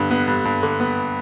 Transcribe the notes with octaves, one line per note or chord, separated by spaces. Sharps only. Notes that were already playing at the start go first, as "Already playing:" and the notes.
Already playing: G2 D3 B3
B3
G2
G2
D3
B3